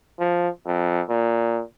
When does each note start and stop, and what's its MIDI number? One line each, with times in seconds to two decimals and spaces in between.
0.19 0.49 53
0.66 1.02 41
1.09 1.61 46